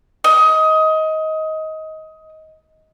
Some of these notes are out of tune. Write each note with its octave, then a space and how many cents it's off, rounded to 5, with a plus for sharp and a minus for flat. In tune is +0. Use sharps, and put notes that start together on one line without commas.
D#5 +20